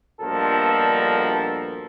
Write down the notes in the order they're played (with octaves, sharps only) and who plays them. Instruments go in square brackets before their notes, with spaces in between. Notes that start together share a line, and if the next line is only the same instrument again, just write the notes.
[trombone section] A#1 G2 B2 F3 A4 A#4